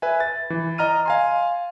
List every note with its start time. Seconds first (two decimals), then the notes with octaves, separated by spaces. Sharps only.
0.02 B4 E5 G#5
0.20 A6
0.50 E3
0.78 D#5 A#5 F6 D#7
1.06 F5 G#5 C6